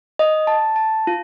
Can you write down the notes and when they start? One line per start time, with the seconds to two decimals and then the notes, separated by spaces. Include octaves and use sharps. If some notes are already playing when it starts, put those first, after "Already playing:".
0.19 D#5
0.47 A5
0.76 A5
1.07 F4